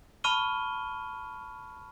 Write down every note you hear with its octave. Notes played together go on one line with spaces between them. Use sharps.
A5 B5 C#6 F6 D#7 G7